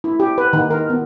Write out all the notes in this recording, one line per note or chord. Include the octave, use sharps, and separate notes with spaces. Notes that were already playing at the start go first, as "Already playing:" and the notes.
E4
G4
B4
D#3
A#4
B3